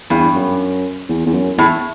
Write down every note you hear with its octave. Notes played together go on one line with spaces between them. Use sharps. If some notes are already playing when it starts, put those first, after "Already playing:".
E2 G2
F#2
E2
E2
F#2
E2 A2